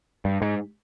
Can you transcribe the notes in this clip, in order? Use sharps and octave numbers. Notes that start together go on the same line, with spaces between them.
G2
G#2